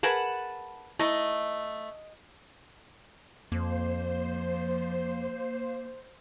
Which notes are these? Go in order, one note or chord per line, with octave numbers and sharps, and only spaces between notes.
G#4 A#4 B4 F#5 A5 B5
A3 D#4 E4 D#5
F2 F3 A#3 C5